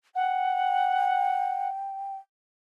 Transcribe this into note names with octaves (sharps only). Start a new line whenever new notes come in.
F#5 G5